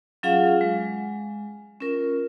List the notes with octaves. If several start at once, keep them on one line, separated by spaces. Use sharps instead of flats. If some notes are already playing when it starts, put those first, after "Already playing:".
F#3 C#4 F4 G#4 F5 F#5
G#3
C#4 F4 A#4